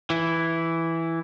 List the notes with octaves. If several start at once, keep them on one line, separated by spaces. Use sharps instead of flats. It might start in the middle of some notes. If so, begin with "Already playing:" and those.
E3 E4